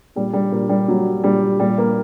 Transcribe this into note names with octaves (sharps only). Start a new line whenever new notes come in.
A#2 G3
G3
A#2 A#3
G3
A#2 F#3
A#2 G3
A#2 G3
A#3